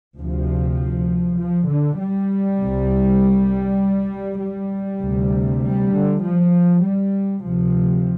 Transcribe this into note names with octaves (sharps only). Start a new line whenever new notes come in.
D2 C3 F3
F3
D3
G3
C2 C3
G3
D2 C3
G3
D3
F3
G3
D2 C3 F3